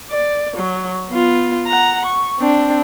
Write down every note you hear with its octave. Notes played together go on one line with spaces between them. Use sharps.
D5
F#3
B3 F4
F#5 A#5
C#6
C4 D4